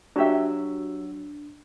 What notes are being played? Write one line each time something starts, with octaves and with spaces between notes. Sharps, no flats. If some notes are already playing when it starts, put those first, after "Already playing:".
F#3 D4 F#4 G4 E5 E6